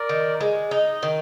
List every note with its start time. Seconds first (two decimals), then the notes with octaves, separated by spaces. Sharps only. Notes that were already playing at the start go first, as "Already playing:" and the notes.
Already playing: A#4 D5
0.09 D#3
0.40 G#3
0.71 D#4
1.03 D#3